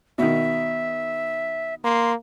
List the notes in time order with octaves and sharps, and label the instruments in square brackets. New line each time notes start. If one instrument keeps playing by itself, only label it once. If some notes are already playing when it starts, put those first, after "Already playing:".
[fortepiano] B2 D#3 [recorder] E5
[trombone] A#3 [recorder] C6